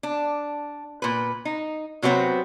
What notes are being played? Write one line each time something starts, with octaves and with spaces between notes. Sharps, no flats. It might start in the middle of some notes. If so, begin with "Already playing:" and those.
D4
A#2 B4
D#4
C3 F#3 G3 B3 C4